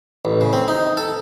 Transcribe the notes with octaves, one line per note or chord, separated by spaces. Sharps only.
A1
C#3
C4
D#4
A4